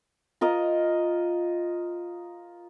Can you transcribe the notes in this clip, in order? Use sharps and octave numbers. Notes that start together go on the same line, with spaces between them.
F4 A#4 D#5